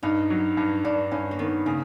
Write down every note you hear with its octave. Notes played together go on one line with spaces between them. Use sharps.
G2 D#4
F#3
G2
G2 D4
G2 C#4
A#3
D#3 B3
C#3 A#3